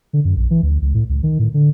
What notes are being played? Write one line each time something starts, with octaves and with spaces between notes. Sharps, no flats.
D3
F#2
A#1
E3
D2
C#2
A2
C#2
D#3
A2
D3